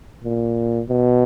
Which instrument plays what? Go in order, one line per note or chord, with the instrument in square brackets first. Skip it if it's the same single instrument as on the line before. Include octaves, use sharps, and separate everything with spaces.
[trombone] A#2
B2